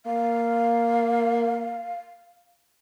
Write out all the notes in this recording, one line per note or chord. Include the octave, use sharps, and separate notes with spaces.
A#3 F5